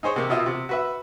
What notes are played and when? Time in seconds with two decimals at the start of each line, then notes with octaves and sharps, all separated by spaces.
0.03 D#4 G#4 C5 C#5
0.16 C3 A#3 G4
0.30 B2 F4 D#5 E5
0.46 C3
0.69 F#4 B4 E5